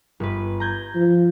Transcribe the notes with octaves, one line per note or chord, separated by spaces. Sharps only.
G1 B4
A#5 G6 G#6
F3